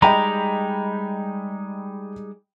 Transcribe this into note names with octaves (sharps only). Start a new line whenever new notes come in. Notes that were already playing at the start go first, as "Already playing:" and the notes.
G3 G#3 D#4 D#5 G5 A#5 B5